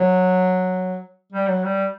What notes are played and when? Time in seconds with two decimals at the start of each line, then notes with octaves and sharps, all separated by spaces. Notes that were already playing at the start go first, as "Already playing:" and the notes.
Already playing: F#3
1.32 G3
1.48 F#3
1.64 G3